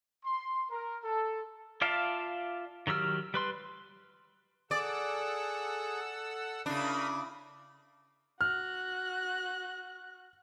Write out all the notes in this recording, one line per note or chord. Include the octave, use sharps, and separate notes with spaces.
C6
A#4
A4
F4 D5 E5 F5 A5
D#3 F#3 G4 E6 F6
G3 B4 C6
G#4 A4 D5 F#5 E6
C#3 D4 E4 A#4 B5 D#6
F#4 F6 F#6